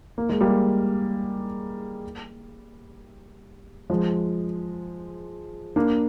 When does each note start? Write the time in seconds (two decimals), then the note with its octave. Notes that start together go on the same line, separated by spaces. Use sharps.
0.18 A#3
0.29 G#3
0.41 G3 A#3
3.90 F3 G#3
5.76 A#3 D4